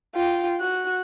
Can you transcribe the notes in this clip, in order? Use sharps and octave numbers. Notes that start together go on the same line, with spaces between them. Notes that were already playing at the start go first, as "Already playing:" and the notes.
F4 G5
F#4 F#6